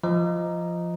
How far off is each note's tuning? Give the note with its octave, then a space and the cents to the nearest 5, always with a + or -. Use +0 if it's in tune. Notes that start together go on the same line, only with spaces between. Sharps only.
F3 -15 D#5 +0 A#5 +0